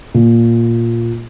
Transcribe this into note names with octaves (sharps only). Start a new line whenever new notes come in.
A#2